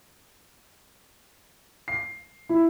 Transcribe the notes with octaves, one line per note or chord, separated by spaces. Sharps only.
C7
E4